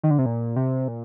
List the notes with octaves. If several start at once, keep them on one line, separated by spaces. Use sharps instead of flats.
D#3
D3
C3
A#2
C3
A#2